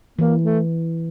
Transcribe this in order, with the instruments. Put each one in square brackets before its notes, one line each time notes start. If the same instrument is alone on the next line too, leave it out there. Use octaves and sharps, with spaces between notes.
[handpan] E3 [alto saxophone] A#3
[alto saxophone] A3